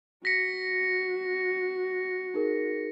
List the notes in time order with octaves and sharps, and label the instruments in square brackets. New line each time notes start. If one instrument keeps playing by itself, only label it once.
[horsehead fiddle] F#4 [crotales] A#6 C#7 [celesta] B6
[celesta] D#4 G#4 A#4